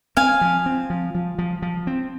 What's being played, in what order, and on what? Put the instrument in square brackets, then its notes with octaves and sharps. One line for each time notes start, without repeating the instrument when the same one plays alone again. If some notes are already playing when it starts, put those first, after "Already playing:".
[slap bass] C4 [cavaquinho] F5 G#5
[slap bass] F3
C4
F3
F3
F3
F3
C4